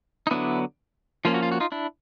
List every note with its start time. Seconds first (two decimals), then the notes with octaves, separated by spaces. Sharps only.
0.27 D#4
0.31 D3 F#3 B3 D4 E4
1.25 F3 A#3 C#4 F4
1.34 F#4
1.43 F4
1.52 F#4
1.60 D#4 F4
1.72 D4 E4